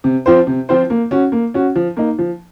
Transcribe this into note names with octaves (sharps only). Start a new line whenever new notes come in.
C3
F3 C4 F4 C5
C3
F3 C4 F4 C5
A#3
C#4 F#4
A#3
C#4 F#4
F3
A#3 D#4
F3